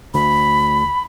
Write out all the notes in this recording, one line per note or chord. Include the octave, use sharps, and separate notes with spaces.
D2 B5